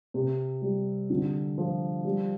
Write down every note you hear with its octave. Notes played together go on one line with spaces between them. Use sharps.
C3
G3
D3
F3
G3